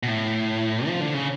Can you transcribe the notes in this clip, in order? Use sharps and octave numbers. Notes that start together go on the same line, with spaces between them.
B2
A2
F3
D3
C#3